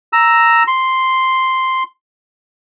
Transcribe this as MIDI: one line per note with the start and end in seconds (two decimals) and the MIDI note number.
0.13 0.63 82
0.13 0.63 88
0.67 1.83 84